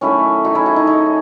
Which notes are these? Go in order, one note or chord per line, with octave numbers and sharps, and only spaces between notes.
D#3 F#3 A3 C#4 E4
D#4 F#4
E4 G#4
D#4 F#4
D#4
D#4